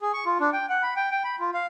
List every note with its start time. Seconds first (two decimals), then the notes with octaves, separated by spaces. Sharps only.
0.01 G#4
0.13 C#6
0.26 F4
0.40 D4
0.53 G5
0.69 F#5
0.83 B5
0.96 G5
1.11 G5
1.24 B5
1.40 F4
1.54 F5